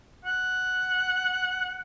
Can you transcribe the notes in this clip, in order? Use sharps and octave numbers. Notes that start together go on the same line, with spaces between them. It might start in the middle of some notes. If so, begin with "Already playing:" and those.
F#5